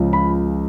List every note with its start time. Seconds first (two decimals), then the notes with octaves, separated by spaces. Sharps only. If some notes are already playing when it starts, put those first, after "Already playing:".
Already playing: C#2 C#3 F3
0.13 B5